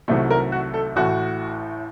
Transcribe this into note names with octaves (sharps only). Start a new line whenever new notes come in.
C2 C3 D#3 F#3 A3
A#4
F#4
A4
A1 A2 A3 F#4